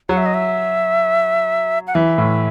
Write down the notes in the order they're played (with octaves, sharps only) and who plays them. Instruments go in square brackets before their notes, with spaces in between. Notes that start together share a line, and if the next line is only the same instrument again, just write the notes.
[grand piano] F#3 [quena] F#5
[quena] E5
D#5
E5
F#5
[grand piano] E3 [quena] E5
[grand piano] A2